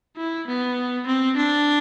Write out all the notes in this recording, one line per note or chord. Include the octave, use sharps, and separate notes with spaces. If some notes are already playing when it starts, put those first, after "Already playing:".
E4
B3
C4
D4